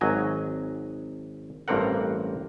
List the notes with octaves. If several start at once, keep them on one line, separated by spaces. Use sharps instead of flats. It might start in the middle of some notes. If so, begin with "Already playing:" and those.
G#1 F#3 D#5 G#5
A1 G2 A#3 C4 A#4 F#5